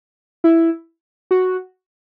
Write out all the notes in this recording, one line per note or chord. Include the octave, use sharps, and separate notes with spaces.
E4
F#4